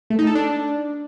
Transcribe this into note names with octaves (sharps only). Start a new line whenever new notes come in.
A3
D#4
A4
D4